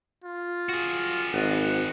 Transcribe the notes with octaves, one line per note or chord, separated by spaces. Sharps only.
F4
F#4 G#4
G#1 F#5